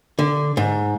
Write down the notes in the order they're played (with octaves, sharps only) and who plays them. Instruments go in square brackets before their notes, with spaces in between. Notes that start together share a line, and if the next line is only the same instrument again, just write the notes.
[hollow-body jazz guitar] D3
G#2